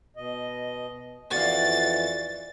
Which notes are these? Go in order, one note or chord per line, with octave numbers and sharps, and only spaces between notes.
B2 D#5
F2 E3 F#4 D5 F5 A6